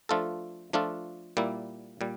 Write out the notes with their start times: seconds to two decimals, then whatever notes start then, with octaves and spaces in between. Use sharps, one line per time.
0.09 F3 A3 D4 F4 A4
0.73 F3 A3 D4 F4 A4
1.37 A#2 G3 A#3 E4
2.01 A#2 G3